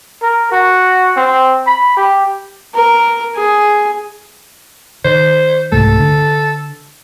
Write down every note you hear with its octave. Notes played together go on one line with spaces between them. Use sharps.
A#4
F#4
C4
B5
G4
A#4
G#4
D#3 C5
C2 G#2 A3 A4
D3